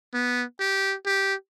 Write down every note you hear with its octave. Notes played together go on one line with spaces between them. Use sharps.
B3
G4
G4